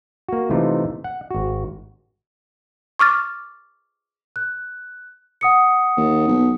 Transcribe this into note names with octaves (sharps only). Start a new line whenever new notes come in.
A#3 F#4
C3 E3 A3 D#4 F4
F#5
G#1 F#4
C#6 D6 F6 A6
F#6
F#5 D#6 C#7
D#2
B1